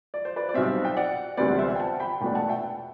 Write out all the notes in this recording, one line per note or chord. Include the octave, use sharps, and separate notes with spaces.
D5
C5
B4 D5
D5
B1 B2 G3 C4 C5 E5
G5
D5 F#5
E1 D2 C3 G3 C4 B4 D5
C5 E5
G5
F#5 A5
G5 B5
E1 E2 B2 A3 D4 G5 B5
F#5 A5
E5 G5